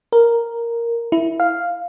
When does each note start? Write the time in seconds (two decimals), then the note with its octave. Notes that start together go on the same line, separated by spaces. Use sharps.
0.12 A#4
1.12 E4
1.40 F5